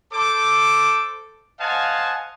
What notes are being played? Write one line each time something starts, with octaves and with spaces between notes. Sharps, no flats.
A4 C5 D6
C5 D#5 F5 F#5 G#5 A5